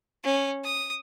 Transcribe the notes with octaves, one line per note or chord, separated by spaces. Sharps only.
C#4
D#6